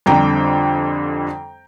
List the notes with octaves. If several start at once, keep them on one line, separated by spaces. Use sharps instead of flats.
F2 D3 G3 C4 G5 A#5